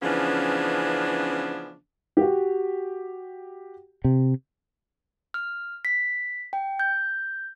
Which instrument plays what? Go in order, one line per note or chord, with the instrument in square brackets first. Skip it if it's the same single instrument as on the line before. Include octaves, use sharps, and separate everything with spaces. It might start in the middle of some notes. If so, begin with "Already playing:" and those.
[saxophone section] C#3 E3 F3 B3 C#4 D4
[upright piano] F#4 G4
[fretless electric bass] C3
[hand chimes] F6
B6
G5
G6